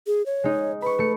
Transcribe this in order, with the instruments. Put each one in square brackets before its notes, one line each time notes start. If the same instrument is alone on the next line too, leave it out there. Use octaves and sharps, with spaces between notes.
[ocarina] G#4
C#5
[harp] G#3 D#4
[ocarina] B4 [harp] B5 C#6
[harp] A3 C#7